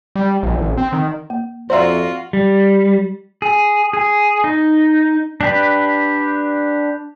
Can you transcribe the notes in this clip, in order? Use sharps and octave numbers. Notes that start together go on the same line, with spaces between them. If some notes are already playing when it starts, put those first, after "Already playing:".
G3
A#1
A1
C4
D#3
A#3
F2 F4 F#4 C5 D5 E5 A#5 C6
G3
G#4
G#4
D#4
D4 G4 B4